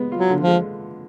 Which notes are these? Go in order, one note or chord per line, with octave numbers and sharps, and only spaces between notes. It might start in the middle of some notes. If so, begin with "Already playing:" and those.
Already playing: G#3 B3
F4
F#3
D3
F3
G#3